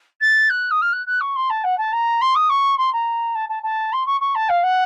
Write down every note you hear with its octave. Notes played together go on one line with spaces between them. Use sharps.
A6
F#6
D#6
F6
F#6
F#6
C#6
C6
A5
F#5
A5
A#5
C6
D#6
C#6
C6
A#5
A5
A5
A5
C6
C#6
C#6
A5
F5
F#5